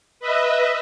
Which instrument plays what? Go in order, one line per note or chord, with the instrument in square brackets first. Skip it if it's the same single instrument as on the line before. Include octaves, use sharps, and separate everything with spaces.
[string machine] B4 D#5 E5